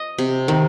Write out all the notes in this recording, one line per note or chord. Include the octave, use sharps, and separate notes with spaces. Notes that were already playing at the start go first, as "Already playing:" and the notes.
Already playing: D#5
C3
D#3